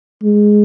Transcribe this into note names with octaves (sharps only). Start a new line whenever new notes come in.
G#3